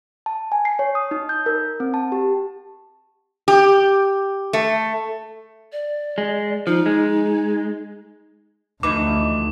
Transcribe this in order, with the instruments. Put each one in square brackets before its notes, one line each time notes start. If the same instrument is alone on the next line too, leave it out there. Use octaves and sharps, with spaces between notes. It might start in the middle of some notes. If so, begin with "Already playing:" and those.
[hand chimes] A5
G#5
C7
C#5
D#6
D#4
G6
A#4
C4
A5
G4
[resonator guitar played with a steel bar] G4
A3
[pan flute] D5
[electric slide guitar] G#3
[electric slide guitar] F3 [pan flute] D#4
[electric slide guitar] G#3
[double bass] D2 [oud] E3 F3 D#4 [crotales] D6